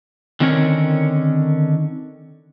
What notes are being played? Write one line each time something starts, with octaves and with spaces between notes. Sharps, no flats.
D3 D#3 C4 C#4 A#4 C#5